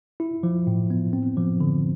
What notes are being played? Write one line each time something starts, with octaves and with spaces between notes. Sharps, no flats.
E4
F3
A2
B3
C4
F3
D3